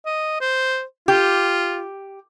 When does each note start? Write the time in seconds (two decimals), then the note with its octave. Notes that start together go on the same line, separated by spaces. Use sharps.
0.06 D#5
0.41 C5
1.08 F4 G4